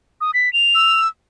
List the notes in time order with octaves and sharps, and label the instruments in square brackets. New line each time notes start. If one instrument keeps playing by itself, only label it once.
[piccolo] D#6
B6
F7
[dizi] E6